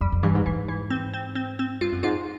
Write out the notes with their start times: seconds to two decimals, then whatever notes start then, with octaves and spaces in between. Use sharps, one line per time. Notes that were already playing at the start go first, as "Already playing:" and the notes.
0.01 F2 G3
0.12 F2
0.23 G2 E3
0.35 G#2
0.46 G#2 E3
0.68 E3
0.90 C4
1.14 C4
1.35 C4
1.59 C4
1.81 G2 F4
1.92 F#2
2.03 G#2 F4